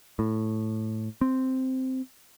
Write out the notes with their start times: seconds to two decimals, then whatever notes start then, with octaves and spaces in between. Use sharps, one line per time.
0.19 A2
1.21 C4